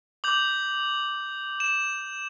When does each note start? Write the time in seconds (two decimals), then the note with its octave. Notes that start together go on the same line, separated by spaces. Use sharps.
0.24 D6 G6 F#7
1.60 E7